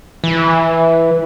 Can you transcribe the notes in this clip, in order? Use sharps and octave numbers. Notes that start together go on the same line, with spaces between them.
E3